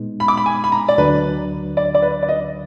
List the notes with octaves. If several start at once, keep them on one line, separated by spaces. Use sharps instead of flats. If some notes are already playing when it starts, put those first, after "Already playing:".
Already playing: A#2 G#3 B3 D#4
B5
D6
B5
G#5
B5
A#5
D5
D2 D3 F#3 D4 B4
D5
D5
B4
D5
D#5